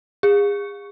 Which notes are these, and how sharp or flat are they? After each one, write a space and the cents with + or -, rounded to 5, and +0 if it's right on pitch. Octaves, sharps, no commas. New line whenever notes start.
G#4 -35